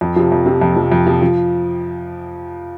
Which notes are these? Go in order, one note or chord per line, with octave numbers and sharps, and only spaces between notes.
F2
C3 F3
F2
C3 F3
F2
C3 F3
F2
C3 F3
F3